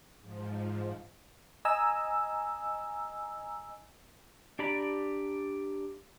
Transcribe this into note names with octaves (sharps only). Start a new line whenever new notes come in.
G#2 F3
D#5 G#5 A#5 E6
D4 G4 D5 A#5 B5